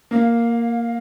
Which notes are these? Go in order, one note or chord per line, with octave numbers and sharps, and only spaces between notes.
A#3 F5